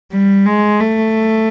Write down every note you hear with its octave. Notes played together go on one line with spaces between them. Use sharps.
G3
G#3
A3